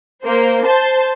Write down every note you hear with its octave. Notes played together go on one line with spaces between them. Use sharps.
A#3 C5
C5 A5